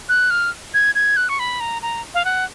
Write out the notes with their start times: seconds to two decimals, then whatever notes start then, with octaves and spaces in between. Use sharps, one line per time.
0.09 F#6
0.30 F6
0.74 G#6
0.95 G#6
1.17 F#6
1.29 C#6
1.39 B5
1.60 A#5
1.82 A#5
2.14 F5
2.25 F#5